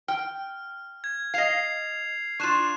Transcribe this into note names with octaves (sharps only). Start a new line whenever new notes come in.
G5 F6
G#6
D#5 F5 C7 F7
D4 F4 C#6 F#6 E7